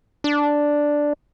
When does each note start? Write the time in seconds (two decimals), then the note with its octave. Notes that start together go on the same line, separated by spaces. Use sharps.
0.24 D4